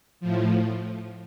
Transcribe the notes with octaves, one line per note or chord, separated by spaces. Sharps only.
A2 F3